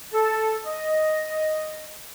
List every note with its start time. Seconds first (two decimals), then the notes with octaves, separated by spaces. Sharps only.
0.13 A4
0.66 D#5